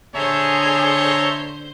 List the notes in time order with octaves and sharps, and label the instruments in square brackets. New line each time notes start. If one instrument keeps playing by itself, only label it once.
[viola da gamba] D3 C5 [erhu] G#4 [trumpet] C#5 [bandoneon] E5 A5 A#5